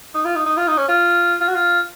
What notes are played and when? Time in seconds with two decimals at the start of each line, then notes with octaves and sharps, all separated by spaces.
0.15 D#4
0.25 F4
0.36 D#4
0.46 D#4
0.57 F4
0.67 D#4
0.77 C#4
0.89 F4
1.41 F4
1.48 F#4
1.55 F4